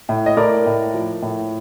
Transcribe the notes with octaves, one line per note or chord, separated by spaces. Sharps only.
A2
D#5
A2 A#4 D5
A2
F3
A2